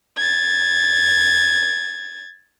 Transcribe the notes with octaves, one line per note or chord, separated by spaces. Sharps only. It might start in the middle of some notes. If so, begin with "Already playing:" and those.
G#6 A6